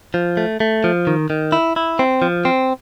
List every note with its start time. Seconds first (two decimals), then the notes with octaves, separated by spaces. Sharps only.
0.14 F3
0.37 A3
0.60 A3
0.84 F3
1.07 D#3
1.30 D#3
1.52 E4
1.76 E4
1.99 C4
2.22 F3
2.45 C4